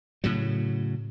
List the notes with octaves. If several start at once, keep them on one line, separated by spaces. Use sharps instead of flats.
A2 C#3 F#3